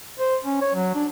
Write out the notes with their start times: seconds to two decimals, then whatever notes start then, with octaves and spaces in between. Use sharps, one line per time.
0.20 C5
0.44 C#4
0.61 C#5
0.75 F#3
0.95 D4